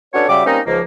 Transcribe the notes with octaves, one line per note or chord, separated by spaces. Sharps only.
C#4 D4 F#4 A4 B4 C#5
C#3 G3 F#4 G4 E5 D6
G3 A#3 C4 C#4 D#4
C#2 G#2 F3 A#3